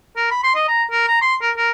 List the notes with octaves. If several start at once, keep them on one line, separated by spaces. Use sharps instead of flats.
A#4
B5
C6
D#5
A#5
A#4
A#5
C6
A#4
A#4